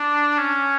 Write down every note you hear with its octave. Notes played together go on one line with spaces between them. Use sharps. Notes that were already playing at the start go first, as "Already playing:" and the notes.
Already playing: D4
C#4